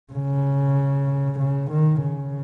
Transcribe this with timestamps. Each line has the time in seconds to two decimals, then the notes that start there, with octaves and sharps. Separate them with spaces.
0.13 C#3
1.39 C#3
1.70 D#3
2.02 C#3